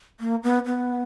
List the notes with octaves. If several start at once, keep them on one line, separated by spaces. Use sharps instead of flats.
A#3
B3
B3